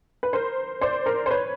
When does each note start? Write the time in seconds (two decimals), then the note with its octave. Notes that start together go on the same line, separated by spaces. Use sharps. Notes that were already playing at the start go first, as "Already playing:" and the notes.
0.23 B4
0.33 A#4 C5
0.81 C5 D5
1.06 A#4 C5
1.26 C5
1.31 B4 C#5